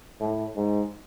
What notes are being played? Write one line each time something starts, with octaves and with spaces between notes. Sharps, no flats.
A2
G#2